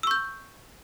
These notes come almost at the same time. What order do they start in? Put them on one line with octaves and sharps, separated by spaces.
E6 C#6 G6